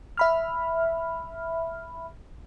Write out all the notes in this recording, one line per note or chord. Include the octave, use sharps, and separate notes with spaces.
E5 B5 F6